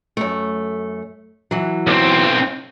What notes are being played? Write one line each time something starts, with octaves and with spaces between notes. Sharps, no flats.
F#2 A3
E3 F#3
B1 C4